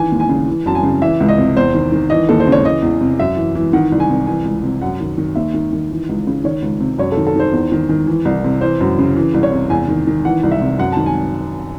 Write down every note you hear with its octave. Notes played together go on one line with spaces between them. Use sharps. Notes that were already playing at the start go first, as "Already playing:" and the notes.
Already playing: D#3 E3 G#5
D#2
G#5
C#3
E3
F#2 A5
G#5
C#3
E3 E5
C#2
D#5
C3
E2 C5
D#3
D#3
E3 D#5
D#2 A4
C5
C#3
C#5
E3 D#5
E2
C3
F#2 E5
E3
E3
D#3 F#5
C2
G#5
C3
E3 G#5
C#2
C3
F#2 F#5
D#3
D#3
D#2 E5
D#3
D#3
E3
C#2
C#3
D#3 C#5
C#2
C3
F#2 C#5
A4
D#3
A4
D#3 C5
E2
D#3
D#3
E3
C2
C3
E3 C5
F#2
C#3
E3
C2
C#5
C3
E2 G#5
D#3
D#3
E3 F#5
C2
E5
C3
F#2 F#5
D#3 A5
G#5